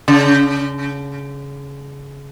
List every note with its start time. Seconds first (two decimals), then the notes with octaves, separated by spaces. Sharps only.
0.08 C#3